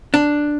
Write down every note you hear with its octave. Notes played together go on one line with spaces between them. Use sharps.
D4